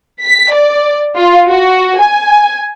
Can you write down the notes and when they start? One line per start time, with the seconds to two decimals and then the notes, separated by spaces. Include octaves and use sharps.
0.23 B6
0.53 D5
1.16 F4
1.48 F#4
1.99 G#5